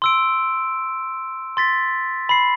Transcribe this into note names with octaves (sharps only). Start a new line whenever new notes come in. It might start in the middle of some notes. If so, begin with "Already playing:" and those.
C6 E6 D7
C6 A6 B6
B5 C7